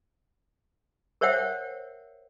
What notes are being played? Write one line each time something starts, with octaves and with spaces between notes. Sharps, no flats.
A#4 C5 C#5 E5 F#5 G5